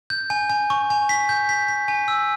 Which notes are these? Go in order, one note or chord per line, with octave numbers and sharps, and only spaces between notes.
G6
G#5
G#5
C#6
G#5
B6
G6
B6
B6
G#5
E6